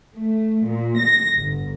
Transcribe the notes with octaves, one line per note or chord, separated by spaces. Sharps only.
A3
A#2
A#6
G1